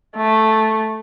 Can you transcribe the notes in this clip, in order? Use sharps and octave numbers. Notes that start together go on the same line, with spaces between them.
A3